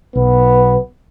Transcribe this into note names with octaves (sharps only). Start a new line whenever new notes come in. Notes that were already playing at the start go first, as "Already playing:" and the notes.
B1 B3